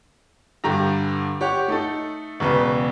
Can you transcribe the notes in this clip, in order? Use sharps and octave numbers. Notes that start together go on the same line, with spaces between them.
G2 D3 G4 A#5
G4 C#5 F#5
A3 D#4 A4
E1 E2 C#3 B4